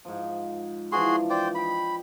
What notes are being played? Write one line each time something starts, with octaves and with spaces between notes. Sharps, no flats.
G#2 F3
E3 F3 D4 F#4 G#4 C6
C5 D5 G5
D#5 G5 B5